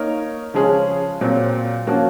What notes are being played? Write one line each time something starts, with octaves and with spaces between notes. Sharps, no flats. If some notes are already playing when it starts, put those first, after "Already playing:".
Already playing: A#3 D#4 A#4 C#5
C#3 F3 G#3 C#4 G#4
A#2 F#3 C4
F3 A#3 C#4 F#4